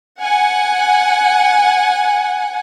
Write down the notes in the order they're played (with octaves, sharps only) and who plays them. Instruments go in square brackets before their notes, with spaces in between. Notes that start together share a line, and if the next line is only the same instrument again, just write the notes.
[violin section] F#5 G#5